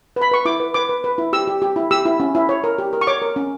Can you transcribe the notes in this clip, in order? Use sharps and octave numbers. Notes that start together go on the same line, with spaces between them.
B4
B5
B4 C#6
E4 D6
B4
B4 D6
B4
B4
E4
G4 E6
G4
G4
E4
G4 E6
E4
C#4
E4
C#5
A#4
G4
A#4
C#6
C#5 D6
A#4
C#4